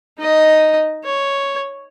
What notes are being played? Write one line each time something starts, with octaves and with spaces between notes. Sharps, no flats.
D#4 D#5
C#5